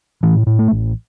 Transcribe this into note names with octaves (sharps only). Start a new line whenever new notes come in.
A2 E3
A2
A3
A1